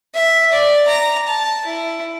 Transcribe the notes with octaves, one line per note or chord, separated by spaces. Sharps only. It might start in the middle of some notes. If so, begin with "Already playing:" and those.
E5
D5
A#5
A5
E4